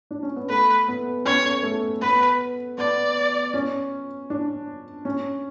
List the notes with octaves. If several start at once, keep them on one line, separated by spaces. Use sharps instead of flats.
D4
C#4
B3
A3 B4
B3
C#4 C#5
A3
B3 B4
B3 D5
C#4
D4
C#4